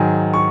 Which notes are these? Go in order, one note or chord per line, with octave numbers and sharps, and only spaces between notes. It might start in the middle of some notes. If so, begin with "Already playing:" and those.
Already playing: G#2 D#3 F#3 G#5
C#6